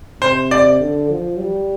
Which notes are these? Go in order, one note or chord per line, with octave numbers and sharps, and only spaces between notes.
C3 C5
D5
D3
F3
G3